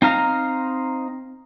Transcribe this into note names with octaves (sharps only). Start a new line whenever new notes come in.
C4 D#4 F5 A#5